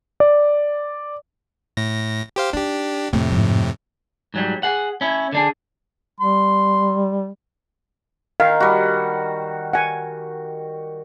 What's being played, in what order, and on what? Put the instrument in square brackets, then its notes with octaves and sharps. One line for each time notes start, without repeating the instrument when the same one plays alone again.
[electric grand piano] D5
[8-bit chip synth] A2 A#6
G4 C5 F5
[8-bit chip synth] D4 G4 [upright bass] D#4
[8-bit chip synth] F2 A2 C3 [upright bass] A3
[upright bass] G#2 F3
[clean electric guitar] G#2 F#3 G3
G#4 F#5
C#4 E4
D3 D4 G#4
[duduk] G3 [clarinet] C6
[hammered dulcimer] D#3 [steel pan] F5
[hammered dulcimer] G3 F#4
[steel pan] F#5 G#5